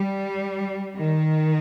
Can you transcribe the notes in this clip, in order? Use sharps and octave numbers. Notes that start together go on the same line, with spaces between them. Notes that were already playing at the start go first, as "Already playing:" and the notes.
Already playing: G3
D#3